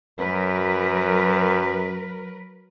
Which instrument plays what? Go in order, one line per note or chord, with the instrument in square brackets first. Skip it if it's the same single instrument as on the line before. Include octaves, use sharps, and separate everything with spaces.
[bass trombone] F#2 [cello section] F#3 A#4 B4